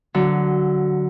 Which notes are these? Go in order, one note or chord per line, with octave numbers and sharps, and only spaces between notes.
D3 F#3